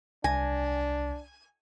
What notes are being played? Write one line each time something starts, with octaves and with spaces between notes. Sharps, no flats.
C2 D4 G#5 A#6